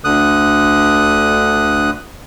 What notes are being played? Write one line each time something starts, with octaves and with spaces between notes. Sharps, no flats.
D2 D3 D#6 F#6